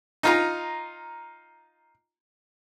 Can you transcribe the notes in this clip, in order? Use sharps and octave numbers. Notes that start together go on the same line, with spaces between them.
D#4 F4 A#5